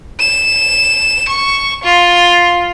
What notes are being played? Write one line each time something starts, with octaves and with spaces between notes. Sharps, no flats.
E7
C#6
F4